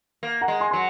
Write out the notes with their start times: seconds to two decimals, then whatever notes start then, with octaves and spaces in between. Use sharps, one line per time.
0.23 A#3
0.41 F#5 A#5
0.48 G#3
0.60 G#5 C6
0.71 F#3 C6